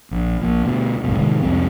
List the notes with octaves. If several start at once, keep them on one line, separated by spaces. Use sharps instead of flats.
A#1
A#1 A#2
D2 B2
F#1 B1 G#2 B2
A2 C3 D#3 G#3
C2 F2 G#3 C4